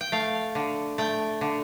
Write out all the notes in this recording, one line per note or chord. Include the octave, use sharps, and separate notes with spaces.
G5
A3 F5
D3
A3 G5
D3